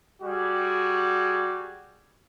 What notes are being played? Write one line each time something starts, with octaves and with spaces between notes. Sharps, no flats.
G3 F#4 G#4